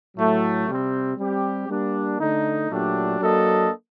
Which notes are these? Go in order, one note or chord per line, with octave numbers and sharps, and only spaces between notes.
A2 F#3 A3
C3 G3 C4
G3 C4 G4
G3 A#3 D4
D3 A3 D#4
A#2 F#3 A3 D4 G4
F#3 A#3 D4 A4 D#5